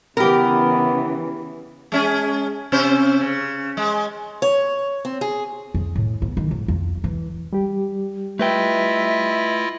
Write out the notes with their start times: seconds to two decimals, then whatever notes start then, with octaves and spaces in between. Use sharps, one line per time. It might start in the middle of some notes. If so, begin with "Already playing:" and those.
0.17 C#3 E3 B3 G4 A#4
1.92 G#3 C#4 G#4
2.72 C3 C#4 C5
3.21 C#3
3.77 G#3
4.42 C#5
5.05 C4
5.21 G#4
5.74 F2
5.96 A2
6.22 B3
6.37 D#3
6.51 G#2
6.68 F2
7.04 E3
7.53 G3 G4
8.39 A3 E4 F4 B4 D#5 E5 G5